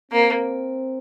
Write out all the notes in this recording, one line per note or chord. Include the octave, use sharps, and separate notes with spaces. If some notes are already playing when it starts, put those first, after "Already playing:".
A#3 C4